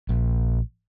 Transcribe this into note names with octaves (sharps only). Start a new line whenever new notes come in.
A#1